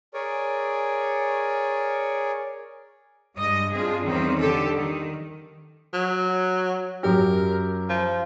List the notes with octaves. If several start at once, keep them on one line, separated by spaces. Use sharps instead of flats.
G#4 A#4 C#5 D5 G#5
G2 G#3 D#5
C4 D4 F4 G#4
E2 D#3 G3 C4 C#4
D3 G4 A4
D#3
F#3
F#2 G4 A#4
F3